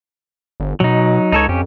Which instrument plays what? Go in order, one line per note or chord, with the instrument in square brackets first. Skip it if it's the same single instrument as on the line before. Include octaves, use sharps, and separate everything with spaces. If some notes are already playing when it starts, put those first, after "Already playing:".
[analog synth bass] G1
[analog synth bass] B2 [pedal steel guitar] F#3 D#4
[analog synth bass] C#2 [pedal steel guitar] D#4 A4 C#5
[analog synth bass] F2 [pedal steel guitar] C#4 G4